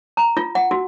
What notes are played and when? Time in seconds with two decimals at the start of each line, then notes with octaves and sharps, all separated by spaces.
0.17 A#5
0.37 F4
0.55 F#5
0.71 F#4